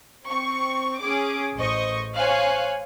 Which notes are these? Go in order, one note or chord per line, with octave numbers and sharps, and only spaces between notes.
C4 C#6
C#4 G#4 D6
A1 C5 D#5 C#6
C5 C#5 F5 G#5 F#6